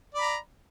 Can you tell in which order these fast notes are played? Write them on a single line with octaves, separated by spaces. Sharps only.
D5 B5 A#5